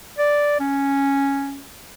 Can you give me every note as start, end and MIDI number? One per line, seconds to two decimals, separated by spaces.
0.18 0.58 74
0.60 1.62 61